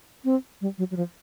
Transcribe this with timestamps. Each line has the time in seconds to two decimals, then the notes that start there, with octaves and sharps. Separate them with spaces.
0.25 C4
0.61 G3
0.78 F#3
0.91 F#3
0.97 F3